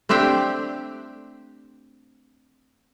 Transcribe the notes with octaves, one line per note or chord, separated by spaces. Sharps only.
A3 C4 D4 G4 G5